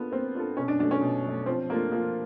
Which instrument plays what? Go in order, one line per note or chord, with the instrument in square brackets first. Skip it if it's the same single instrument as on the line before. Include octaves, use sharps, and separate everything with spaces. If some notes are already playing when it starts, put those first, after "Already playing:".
Already playing: [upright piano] A#3 D4 F4 A4 [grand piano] B3
[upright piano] A#3 [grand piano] C4
[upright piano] D4 F4 A4
[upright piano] B2 [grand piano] C#4
[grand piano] D4
[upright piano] F#3 A3 [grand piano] D4
[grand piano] C#4
[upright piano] B2
F#3 A3
[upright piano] F3 [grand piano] C4
[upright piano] A3 D4 F4 [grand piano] A#3
[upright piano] F3 [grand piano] A#3